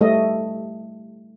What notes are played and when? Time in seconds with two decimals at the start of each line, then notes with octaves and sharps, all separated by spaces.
0.01 G3 A3 A4 D#5